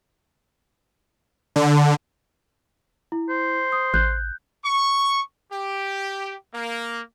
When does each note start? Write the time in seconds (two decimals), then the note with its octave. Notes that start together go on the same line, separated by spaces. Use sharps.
1.56 D3
3.12 E4
3.30 C5
3.72 D#6
3.94 A1 F#6 G6
4.65 C#6
5.53 G4
6.54 A#3